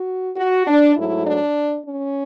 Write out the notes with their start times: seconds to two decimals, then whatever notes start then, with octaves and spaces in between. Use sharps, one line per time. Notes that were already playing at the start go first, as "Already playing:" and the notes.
Already playing: F#4
0.37 F#4
0.67 D4
0.96 G#2 F#3 A3 E4
1.27 D4
1.86 C#4